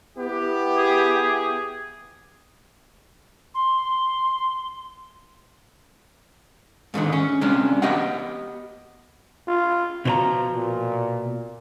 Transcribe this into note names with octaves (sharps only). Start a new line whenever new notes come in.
B3 E4 G4
G#4
C6
G#2 B2 D3 D#3
C#4
C3 G#3 C#4 D4
B3 G4 C#5 D#5 F#5
F4
B2 F3 C5 A#5
A#2